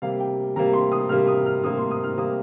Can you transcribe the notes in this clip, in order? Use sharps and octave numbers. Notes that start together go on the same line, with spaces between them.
C3 G3 A#3 F5
G5
C3 G3 A#3 A#5
C6
D#6
C3 G3 A#3 F6
D#6
F6
C3 G3 A#3 D#6
C6
D#6
F6
C3 G3 A#3 D#6